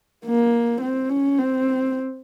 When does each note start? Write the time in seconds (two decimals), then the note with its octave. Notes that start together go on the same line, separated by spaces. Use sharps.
0.25 A#3
0.81 C4
1.10 C#4
1.38 C4